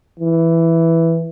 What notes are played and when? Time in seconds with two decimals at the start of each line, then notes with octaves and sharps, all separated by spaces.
0.19 E3